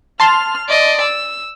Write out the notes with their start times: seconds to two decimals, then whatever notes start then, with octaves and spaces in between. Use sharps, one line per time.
0.20 A5 C6 F6
0.68 D5 D#5
1.01 E6